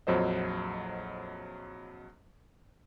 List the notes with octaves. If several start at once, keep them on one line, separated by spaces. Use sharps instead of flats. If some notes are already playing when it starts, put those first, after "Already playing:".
A#1 F2 F#3 C5 D#5